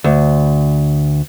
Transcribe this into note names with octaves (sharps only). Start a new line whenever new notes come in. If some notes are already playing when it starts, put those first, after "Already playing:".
D2